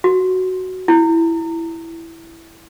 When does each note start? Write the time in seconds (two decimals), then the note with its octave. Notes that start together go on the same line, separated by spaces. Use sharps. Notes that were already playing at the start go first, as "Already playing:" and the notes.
0.04 F#4
0.88 E4